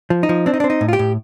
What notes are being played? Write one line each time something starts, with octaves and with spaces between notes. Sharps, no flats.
F3
D#4
F3
C4 D4
D#4
D4
C4
D#4
A2
F4
G4
A2